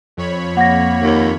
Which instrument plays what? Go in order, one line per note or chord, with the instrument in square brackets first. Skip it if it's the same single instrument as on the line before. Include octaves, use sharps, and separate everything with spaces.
[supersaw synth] F2 C#5 B5
[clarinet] A#3 [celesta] F#5 A#6
[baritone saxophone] D#2